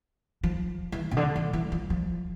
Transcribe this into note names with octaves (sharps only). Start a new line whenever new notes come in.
F3
E3
C3
D3
E3
E3
F3
F3